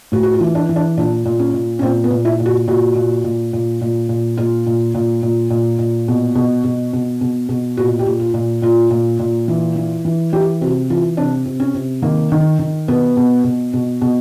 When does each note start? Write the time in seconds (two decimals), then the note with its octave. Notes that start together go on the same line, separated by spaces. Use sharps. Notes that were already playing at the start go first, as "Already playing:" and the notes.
0.12 A2 F#4
0.23 F#4
0.34 F4
0.41 E3
0.55 D4
0.69 E3
0.76 D4
0.97 A#2 D4
1.25 A#2
1.39 C#4
1.53 A#2
1.79 C#4
1.82 A#2 C4
2.04 B3
2.10 A#2
2.25 E4
2.40 A#2
2.46 F#4
2.68 A#2 F#4
2.95 A#2
3.24 A#2
3.53 A#2
3.81 A#2
4.09 A#2
4.37 A#2 F4
4.66 A#2
4.94 A#2
5.23 A#2
5.50 A#2
5.79 A#2
6.08 B2
6.35 B2
6.64 B2
6.93 B2
7.21 B2
7.49 B2
7.77 A#2 F#4
7.99 G4
8.06 A#2
8.20 F4
8.34 A#2
8.62 A#2 F4
8.90 A#2
9.19 A#2
9.48 E3
9.76 E3
10.05 E3
10.33 E3 G4
10.61 C3 F#4
10.90 E3 F4
11.17 C3 D4
11.46 C3
11.60 C#4
11.74 C3
12.02 D#3 A#3
12.32 D#3
12.59 D#3
12.88 B2 B3
13.17 B2
13.44 B2
13.74 B2
14.02 B2